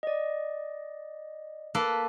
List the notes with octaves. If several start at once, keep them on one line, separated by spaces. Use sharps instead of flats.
D5 D#5
A#3 A4 B4